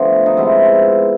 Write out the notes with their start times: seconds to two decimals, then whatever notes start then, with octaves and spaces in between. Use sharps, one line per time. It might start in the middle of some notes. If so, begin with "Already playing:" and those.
Already playing: D3 F3 A3 B3
0.26 D#4
0.37 C3 F3 G#3 B3 E4